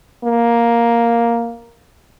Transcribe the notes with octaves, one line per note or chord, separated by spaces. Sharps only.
A#3